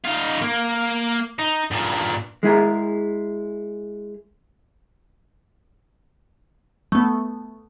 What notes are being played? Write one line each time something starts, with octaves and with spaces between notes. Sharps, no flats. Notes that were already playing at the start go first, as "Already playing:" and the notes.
D#4 F4
A#3
D#4
G2 A#2
G#3 E4 G#4 A#4
A3 B3